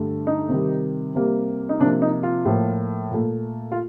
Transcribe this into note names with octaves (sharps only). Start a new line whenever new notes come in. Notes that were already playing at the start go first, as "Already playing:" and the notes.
Already playing: G2 D3 A3
D#4
C3 D#3 G3
C3 G3 A#3
D#4
C3 F3 A#3 D4
D#4
F4
A2 F3 A#3
A#2 A3
F4